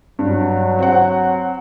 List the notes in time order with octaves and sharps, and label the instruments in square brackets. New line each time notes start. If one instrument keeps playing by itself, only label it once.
[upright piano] G2 [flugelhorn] F#3
[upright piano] C4 F#5